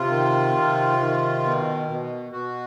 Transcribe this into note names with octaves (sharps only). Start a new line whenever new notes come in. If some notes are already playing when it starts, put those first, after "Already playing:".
Already playing: C3 F4
D#3
C3
D#3
B2
B2
B2 F#4